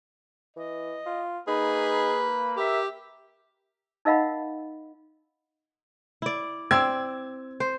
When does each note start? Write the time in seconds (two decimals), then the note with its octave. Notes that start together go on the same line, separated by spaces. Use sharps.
0.57 E3 D#5
1.06 F4
1.48 A#3 D#4 G#4 B4 B5
2.57 G4 A#4 E5
4.05 D#4 A#4 D#5 F5 F#5 B5
6.22 E4 D5
6.71 C4 D5 E6 G#6
7.60 C5